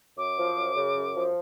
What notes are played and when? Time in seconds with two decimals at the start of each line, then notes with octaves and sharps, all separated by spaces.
0.18 F#2 D6
0.38 F3
0.56 F#2
0.76 C#3
0.96 F#2
1.16 F3